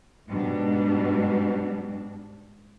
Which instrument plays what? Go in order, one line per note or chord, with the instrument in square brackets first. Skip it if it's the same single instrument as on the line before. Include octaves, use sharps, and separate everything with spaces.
[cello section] G#2 B2 G3 D4